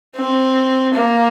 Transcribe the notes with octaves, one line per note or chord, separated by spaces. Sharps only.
C4
A#3